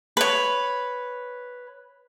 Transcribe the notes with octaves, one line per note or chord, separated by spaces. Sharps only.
B4 C#5